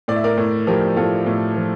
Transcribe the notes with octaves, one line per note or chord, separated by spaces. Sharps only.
A2 D5
E5
A#4 D5
A2
F3 G4 A#4
A2 F4 A4
A2
F3